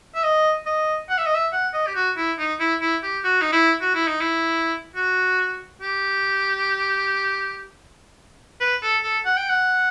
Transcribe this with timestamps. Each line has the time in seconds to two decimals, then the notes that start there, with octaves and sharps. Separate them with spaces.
0.15 E5
0.24 D#5
0.66 D#5
1.09 F#5
1.18 E5
1.26 D#5
1.35 E5
1.53 F#5
1.74 D#5
1.87 G4
1.95 F#4
2.17 E4
2.39 D#4
2.60 E4
2.81 E4
3.03 G4
3.24 F#4
3.42 D#4
3.53 E4
3.81 F#4
3.95 E4
4.07 D#4
4.21 E4
4.96 F#4
5.82 G4
8.61 B4
8.82 A4
9.03 A4
9.25 F#5
9.37 G5
9.50 F#5